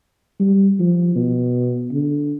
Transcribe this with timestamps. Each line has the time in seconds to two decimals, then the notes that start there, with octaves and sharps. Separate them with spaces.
0.40 G3
0.79 F3
1.16 B2
1.92 D3